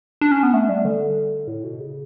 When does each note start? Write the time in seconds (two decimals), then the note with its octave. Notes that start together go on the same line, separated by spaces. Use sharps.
0.21 D4
0.31 C#4
0.43 B3
0.54 A3
0.69 G3
0.85 D3
1.47 A2
1.64 B2
1.80 C#3